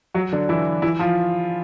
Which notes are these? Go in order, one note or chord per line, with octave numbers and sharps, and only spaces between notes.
F#3 F#4
D3 D4
E3 E4
E3 E4
F3 F4